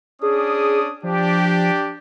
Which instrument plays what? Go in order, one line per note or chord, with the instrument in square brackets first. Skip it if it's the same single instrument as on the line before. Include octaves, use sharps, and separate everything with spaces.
[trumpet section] C#4 D4 D#6 [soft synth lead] G#4
[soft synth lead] F3 [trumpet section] D4 G4